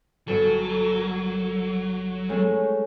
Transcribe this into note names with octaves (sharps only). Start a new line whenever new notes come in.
G1 F#3 A4
A#4
G#3 A3 C#4